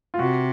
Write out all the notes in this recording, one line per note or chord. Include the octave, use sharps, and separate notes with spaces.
F4
C3 F#4